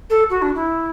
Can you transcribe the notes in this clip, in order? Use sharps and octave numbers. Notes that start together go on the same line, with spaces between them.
A4
F#4
D4
E4